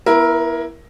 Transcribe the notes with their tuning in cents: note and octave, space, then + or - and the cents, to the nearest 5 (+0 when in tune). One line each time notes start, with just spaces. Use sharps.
B3 -25 E4 +5 A#4 +15